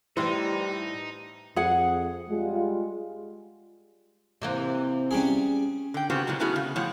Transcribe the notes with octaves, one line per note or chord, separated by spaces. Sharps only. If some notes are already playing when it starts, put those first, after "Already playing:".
A2 E3 G3 D#4 C5
F2 G#4 F#5
G3 G#3 F4
C3 E3 A#3
G3 C#4 G#4
D3 G5
C#3 B3 C4 F#4 G4
A#2 C#3 F#3 G#3
A3 B3 C#4 E4 F#4 G#4
C#3
A2 F3 C#5 F#5